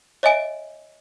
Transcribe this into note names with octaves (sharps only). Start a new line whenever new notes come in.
C#5 D#5 E5 G#5 D7